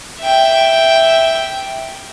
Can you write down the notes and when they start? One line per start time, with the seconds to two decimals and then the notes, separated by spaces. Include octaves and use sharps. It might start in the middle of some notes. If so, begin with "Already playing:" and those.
0.21 E5 G5